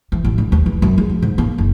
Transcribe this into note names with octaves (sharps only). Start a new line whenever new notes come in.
E3
A1
D3
D#2
E3
F#2
G#3
F3
G#2
A#3
F#1